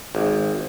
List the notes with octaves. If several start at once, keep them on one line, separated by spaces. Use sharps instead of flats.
G#1